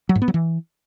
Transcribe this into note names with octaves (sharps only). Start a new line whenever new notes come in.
F#3
G#2
B3
F#3
E3